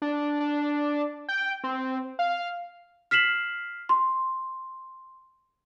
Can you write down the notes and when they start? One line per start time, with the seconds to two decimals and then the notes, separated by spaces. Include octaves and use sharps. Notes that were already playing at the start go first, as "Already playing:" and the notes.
0.02 D4
0.40 D4
1.28 G5
1.64 C4
2.19 F5
3.11 F6 B6 C7 E7 F#7
3.89 C6